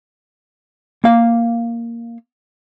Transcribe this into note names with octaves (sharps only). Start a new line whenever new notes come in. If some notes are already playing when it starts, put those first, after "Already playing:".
A#3 F5